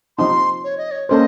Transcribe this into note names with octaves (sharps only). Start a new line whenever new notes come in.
F3 C4 D#4 C6
C#5
D#5
C#5
A#3 C#4 A4 C5 D#5